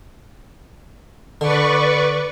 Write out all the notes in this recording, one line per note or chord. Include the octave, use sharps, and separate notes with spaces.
D3 B4 D5 C#6